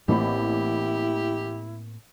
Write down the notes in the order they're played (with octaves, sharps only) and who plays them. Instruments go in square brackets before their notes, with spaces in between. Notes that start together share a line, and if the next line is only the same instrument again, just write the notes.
[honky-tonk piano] A1 B5 [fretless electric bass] A2 A#3 C4 [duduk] E4 [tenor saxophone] G4